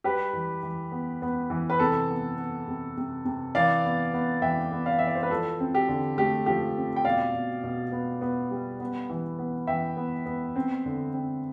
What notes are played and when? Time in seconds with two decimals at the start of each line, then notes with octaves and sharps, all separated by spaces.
0.04 G3 G4 B4
0.33 E3
0.63 E3
0.92 B3
1.22 B3
1.50 E3
1.70 B4
1.80 C3 A4
2.10 B3
2.38 B3
2.68 C3
2.97 C3
3.25 C3
3.55 E3 D5 F5
3.85 B3
4.14 B3
4.42 E3 E5 G5
4.72 B3
4.86 D5 F5
4.99 E3 E5
5.07 D5
5.15 C5
5.23 B4
5.30 F3 A4
5.60 C4
5.75 G4
5.89 D3
6.18 A3 G4
6.46 F3 G4
6.77 C4
6.96 G5
7.05 B2 D5 F5
7.34 B2
7.64 B2
7.92 B3
8.21 B3
8.51 G3
8.80 B3
9.10 E3
9.39 B3
9.67 E3 E5 G5
9.97 B3
10.26 B3
10.56 C4
10.85 D3
11.14 C4